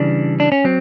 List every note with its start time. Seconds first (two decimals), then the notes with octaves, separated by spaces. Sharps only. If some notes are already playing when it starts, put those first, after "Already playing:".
Already playing: C#3 E3 G3 D4
0.40 D4
0.52 C#4
0.64 F#3 C4